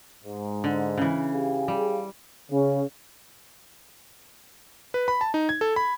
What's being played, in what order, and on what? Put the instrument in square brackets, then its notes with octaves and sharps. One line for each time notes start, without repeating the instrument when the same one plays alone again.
[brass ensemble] G#2
[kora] D3
C#3 E3
[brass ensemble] G4 G#4 F5
[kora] G3
[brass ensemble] C#3
[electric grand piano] B4
B5
A5
D#4
G#6
A4
B5